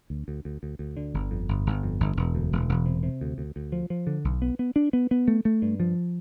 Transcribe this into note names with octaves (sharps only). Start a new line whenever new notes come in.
D2
D2
D2
D2
D2
D3
G1
F2
G1
G1
F2
G1
E1
D2
E1
E1
C3
C3
D2
D2
D2
F3
F3
D3
B1
B3
B3
D4
B3
B3
A3
A3
G2
F3